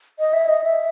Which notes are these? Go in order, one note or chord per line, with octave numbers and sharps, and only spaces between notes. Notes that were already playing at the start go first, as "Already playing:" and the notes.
D#5
E5
D#5
E5